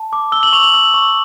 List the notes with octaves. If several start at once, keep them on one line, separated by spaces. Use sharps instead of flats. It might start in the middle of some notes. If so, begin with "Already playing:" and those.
Already playing: A5
D6
E6 G7
F#7
C#6 F7
F#7
E6
C#6